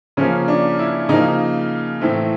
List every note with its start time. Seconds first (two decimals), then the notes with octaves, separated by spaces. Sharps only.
0.17 C#3 F3 A#3 C#4
0.48 D4
0.79 E4
1.09 C#3 F3 A#3 D#4
2.01 A2 E3 A3 C4